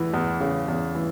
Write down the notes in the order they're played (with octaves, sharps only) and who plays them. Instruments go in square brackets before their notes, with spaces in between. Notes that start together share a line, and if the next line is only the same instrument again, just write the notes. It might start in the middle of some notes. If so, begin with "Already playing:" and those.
Already playing: [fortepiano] E2 E3
E2
C#3
E2
E3